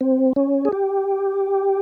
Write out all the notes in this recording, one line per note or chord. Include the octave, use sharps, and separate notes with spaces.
C4
C#4
G#4
G4